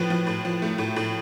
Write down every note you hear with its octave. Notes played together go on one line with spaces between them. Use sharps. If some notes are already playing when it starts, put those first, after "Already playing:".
Already playing: A2 F3 B4
F3
A2
F3
A3
A2
A2